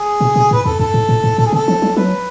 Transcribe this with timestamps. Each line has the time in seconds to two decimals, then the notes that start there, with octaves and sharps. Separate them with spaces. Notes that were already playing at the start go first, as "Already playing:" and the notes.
Already playing: G#4
0.21 B2
0.36 B2
0.51 G#2 B4
0.65 F2 A4
0.79 F#2 A4
0.94 G#2
1.09 A2
1.24 G#2
1.38 A2 A4
1.46 G#4
1.53 C#3 A4
1.68 F3
1.82 F#3
1.97 F#3 B4